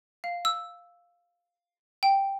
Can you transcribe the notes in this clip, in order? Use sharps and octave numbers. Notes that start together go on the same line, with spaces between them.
F5
E6
G5